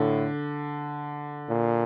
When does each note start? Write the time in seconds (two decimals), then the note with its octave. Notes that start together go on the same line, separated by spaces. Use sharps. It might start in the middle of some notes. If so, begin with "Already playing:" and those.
Already playing: A2 D3
1.49 A#2